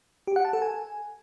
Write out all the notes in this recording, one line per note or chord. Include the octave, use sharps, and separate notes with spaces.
G4
F#5
A5
A4
G#5